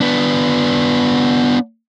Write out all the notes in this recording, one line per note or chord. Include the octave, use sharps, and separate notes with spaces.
B3 D4